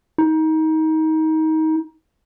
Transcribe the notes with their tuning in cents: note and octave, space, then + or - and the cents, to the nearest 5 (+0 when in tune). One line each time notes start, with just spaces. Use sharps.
D#4 +25